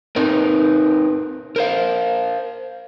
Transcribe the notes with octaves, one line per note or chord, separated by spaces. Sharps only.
C4 D#4 A#4 B4
A#4 C5 F5